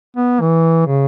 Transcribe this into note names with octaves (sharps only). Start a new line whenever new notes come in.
B3
E3
C#3